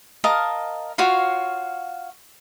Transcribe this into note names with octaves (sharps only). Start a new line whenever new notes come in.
A#4 D#5 F5 A5
F4 F#4 C#5 F5